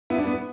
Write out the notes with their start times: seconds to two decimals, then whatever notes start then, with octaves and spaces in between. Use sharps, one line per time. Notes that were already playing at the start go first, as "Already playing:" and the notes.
0.10 B3 E4
0.18 D4
0.27 B3